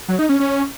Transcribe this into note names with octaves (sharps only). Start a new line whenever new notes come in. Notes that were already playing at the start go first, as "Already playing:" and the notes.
F#3
D#4
C#4
C#4